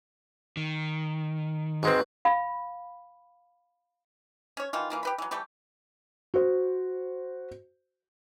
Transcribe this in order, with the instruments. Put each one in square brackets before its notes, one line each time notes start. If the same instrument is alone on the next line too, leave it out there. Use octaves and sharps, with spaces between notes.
[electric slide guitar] D#3
[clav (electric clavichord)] G#2 G#3 C4 [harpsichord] F#4 B4
[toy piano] F5 B5
[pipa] C#4 C#5
D#3 E3 F4
E3 A#3 F4
G4 B4 B5
E3 F#3
E3 G3 A3 G4
[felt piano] F#4 C5